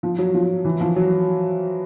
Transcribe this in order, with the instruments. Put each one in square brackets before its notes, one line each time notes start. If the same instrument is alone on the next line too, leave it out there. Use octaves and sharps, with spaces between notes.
[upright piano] F3
F#3
F3
E3
F3
F#3